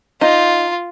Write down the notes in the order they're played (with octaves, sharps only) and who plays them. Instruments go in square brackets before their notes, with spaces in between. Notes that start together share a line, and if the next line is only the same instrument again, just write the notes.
[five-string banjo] D#4 [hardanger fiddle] F4